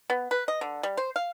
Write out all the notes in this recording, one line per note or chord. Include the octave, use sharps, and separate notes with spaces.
B3
B4
D#5
D3
G3
C5
F5